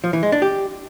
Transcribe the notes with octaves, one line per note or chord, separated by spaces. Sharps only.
F3
E3
G#3
D4
G4